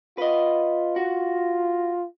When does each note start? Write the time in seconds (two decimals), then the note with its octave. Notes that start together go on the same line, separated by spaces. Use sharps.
0.18 F4 B4 D#5
0.96 F#4